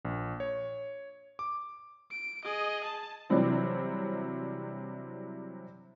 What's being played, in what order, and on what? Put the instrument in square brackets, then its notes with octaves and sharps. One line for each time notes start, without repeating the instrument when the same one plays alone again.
[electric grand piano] A#1
C#5
D6
[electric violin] D7
G#4 D#5
A5
[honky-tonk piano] C3 E3 F#3 G3 C4 D4